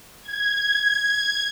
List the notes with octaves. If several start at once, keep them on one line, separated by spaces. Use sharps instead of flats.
G#6